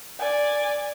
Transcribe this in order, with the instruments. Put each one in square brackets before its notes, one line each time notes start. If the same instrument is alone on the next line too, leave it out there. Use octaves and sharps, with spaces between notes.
[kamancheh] D5 G#5